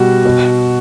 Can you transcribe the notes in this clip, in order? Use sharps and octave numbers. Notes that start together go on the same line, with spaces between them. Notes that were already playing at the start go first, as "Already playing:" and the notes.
Already playing: B2 G3 F#4
B2